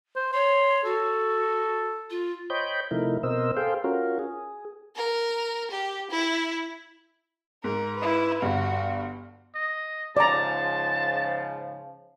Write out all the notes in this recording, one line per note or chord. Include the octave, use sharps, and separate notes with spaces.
C5
C#5 C6
F#4 A4
F4
C5 C#5 D#5 G5 B5 G6
C3 F3 A3 D#4 E4 A#4
B2 C4 A#4 C5 D#5 E6
G#4 A4 C5 F5 G5
C#4 F4 F#4 A#4
G#4
A#4
G4
E4
G#2 A#4
E4 B4
G1 G2 F#4
D#5
G#2 C#3 F3 D5 A5 A#5